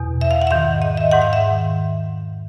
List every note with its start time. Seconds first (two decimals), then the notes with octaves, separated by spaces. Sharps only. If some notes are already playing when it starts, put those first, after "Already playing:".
Already playing: E2 B2
0.21 E5
0.31 F5
0.42 F#5
0.47 E5
0.51 G#2 D#3 F5
0.82 D#5
0.97 E5
1.11 G#2 D#3 F#5
1.22 F5
1.33 E5